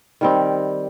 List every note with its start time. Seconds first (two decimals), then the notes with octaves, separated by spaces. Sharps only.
0.21 D#3 G3 C4